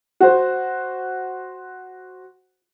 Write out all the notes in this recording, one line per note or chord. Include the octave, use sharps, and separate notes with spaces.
F#4 C5